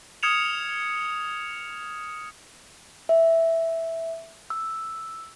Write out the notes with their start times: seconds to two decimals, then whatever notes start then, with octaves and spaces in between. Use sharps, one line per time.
0.23 D#6 F6 G#6 C#7 E7 F7
3.09 E5
4.50 E6